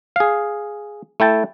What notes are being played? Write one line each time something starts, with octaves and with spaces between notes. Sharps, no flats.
G#4 F5
A3 E4 G5 A5